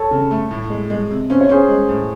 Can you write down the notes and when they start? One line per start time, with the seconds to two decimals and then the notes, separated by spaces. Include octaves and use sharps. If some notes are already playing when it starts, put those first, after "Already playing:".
Already playing: A4 C#5
0.11 C#3
0.31 A3
0.51 A2
0.70 G#3
0.90 G#3
1.10 C3
1.30 C#4 C5
1.41 C#5
1.49 C#4 G#4 C5
1.69 G#3
1.88 A2